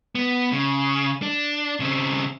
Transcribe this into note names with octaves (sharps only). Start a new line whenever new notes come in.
B3
C#3
D4
C#3 C4